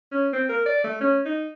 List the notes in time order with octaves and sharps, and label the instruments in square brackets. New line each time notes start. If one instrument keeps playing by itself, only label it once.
[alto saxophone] C#4
C4
A#4
D5
A3
C#4
D#4